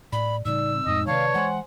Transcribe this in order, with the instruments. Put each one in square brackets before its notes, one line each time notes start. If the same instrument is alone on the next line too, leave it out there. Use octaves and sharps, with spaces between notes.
[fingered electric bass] A2 [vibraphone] D5 [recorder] B5
[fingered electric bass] A2 C#3 G3 [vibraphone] D#4 D5 [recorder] E6
[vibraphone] C4
[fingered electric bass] F2 A2 [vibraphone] G#3 D#4 [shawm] D#5
[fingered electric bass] C3 D#3 [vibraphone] B4 D5 A5 [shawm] C#5 [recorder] F5
[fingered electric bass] E3 G#3 [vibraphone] C5 G#5 C6 [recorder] F#5